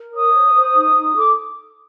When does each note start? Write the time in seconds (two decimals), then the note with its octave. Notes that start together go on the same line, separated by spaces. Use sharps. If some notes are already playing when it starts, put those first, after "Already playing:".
Already playing: A#4
0.14 C#5 D#6
0.34 C5
0.55 C5
0.75 D#4
0.96 D#4
1.16 A4 D6